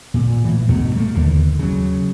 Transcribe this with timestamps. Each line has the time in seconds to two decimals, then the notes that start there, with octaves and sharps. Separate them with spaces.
0.14 A#2
0.44 A2 E3
0.68 D2 G2 B2 A3
0.96 A3 A#3
1.14 D#2 D3 E3
1.59 C#3 F#3